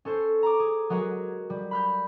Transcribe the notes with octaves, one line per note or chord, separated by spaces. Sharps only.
C#4 A4 C5
A#5 D6
G#4
F#3 G#3 F#4 G#4 A#4
G3
B5 F6 G6